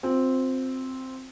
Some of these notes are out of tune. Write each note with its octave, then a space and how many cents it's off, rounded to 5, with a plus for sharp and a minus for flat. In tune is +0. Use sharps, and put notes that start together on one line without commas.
C4 +0 F4 +30